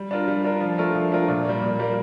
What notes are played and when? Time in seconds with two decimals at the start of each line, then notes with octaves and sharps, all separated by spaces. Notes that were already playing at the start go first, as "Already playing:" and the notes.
Already playing: G3
0.11 D4 F4 A#4
0.28 G3
0.44 D4 F4 A#4
0.61 F3
0.78 A3 D4 F4 A#4
0.95 F3
1.12 A3 D4 F4 A#4
1.28 A#2
1.45 G3 A#3
1.62 A#2
1.79 G3 A#3